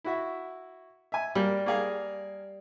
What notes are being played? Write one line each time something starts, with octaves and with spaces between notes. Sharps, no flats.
E4 F#4 E5
E5 G#5
G3 A#3
A#3 G#4 F5